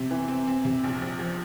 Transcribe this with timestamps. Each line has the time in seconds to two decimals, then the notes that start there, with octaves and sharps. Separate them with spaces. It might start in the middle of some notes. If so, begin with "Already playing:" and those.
Already playing: C3 C4
0.11 E3
0.28 C4
0.47 C4
0.65 C3
0.84 A#1
1.02 A#1
1.19 F3